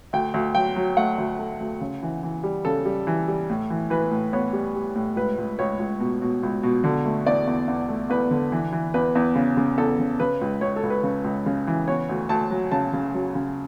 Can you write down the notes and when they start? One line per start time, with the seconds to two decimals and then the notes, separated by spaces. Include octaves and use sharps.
0.13 D2 G5
0.34 D2
0.55 F#3 G5
0.76 F#3
0.97 A3 F#5
1.18 D2
1.39 A3
1.60 D2
1.81 C#3
2.03 E3
2.23 E3
2.43 G3
2.65 C#3 A4
2.85 G3
3.07 E3
3.28 G3
3.49 A2
3.70 E3
3.90 E3 B4
4.11 A2
4.33 B3 C#5
4.53 G3
4.75 G3
4.95 A2
5.16 C#2 B4
5.38 C#2
5.59 C#2 C#5
5.79 C#2
6.00 B2
6.22 B2
6.43 C#2
6.63 B2
6.84 D3
7.06 A3
7.27 E2 D5
7.47 E2
7.68 E2
7.89 A3
8.10 E2 B4
8.31 D3
8.52 E3
8.72 E3
8.94 E2 B4
9.15 E2
9.35 C#3
9.57 C#3
9.78 E2 A4
9.99 C#3
10.20 C#3 B4
10.41 C#2
10.61 C#2 C#5
10.76 A4
10.83 C#2
10.90 B4
11.03 C#3
11.24 C#2
11.46 C#3
11.67 E3
11.87 B3 C#5
12.09 D2
12.29 D2 A5
12.51 F#3
12.71 C#3 A5
12.93 C#3
13.14 F#3
13.35 C#3